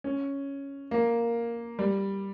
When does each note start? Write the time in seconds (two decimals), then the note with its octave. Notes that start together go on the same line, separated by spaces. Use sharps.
0.04 C#4
0.91 A#3
1.79 G3